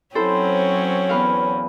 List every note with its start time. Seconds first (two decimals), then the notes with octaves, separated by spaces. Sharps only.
0.15 F#3 C4 C#4 E4 A4 C5
1.09 E2 B4 F5